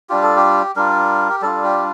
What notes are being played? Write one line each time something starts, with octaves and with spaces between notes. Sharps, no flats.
G3 D4 F4 G4
A4
G4
G3 D4 F4 A#4
G4
G3 D4 F4 A4
G4